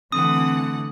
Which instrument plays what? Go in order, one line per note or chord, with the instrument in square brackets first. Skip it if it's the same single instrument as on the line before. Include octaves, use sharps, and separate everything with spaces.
[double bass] D3 A3 [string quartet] E3 F#5 [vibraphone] C4 [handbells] D#6